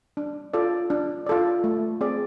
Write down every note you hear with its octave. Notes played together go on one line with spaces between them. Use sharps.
D4
F4 A4 D5
D4
F4 A4 D5
A3
C4 G#4 D5